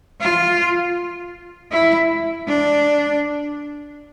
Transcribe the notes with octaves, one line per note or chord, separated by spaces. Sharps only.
F4
E4
D4